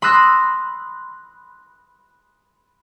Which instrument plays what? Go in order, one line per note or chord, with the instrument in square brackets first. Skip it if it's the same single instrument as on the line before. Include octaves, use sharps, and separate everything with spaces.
[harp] B5 C6 D#6 E6 F#6 A#6